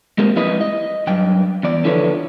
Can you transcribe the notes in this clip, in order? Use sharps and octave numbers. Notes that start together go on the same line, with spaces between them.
G#3 A#3 C4 G4 G#4 A#4
F2 G3 E4 B4 D#5 B5
D#5
G2 F#3 G5
E2 D5
D3 F3 E4 A4 B4 C#5